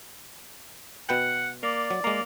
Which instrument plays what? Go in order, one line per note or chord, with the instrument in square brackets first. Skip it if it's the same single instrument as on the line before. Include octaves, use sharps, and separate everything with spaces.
[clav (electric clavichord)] B2 B4 G5 [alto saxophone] F#5
[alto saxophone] A#3 [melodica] D5
[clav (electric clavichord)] F#3
[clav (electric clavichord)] G#3 A#5 [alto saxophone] A#3